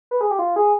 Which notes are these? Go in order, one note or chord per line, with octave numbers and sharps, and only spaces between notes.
B4
G#4
G4
F4
G#4